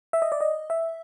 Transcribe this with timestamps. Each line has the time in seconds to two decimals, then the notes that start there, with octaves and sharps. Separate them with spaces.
0.13 E5
0.22 D#5
0.32 D5
0.41 D#5
0.70 E5